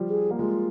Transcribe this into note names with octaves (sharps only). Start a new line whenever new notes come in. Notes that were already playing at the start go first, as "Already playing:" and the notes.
Already playing: F3 G3
G#4
A#3
G#3 F4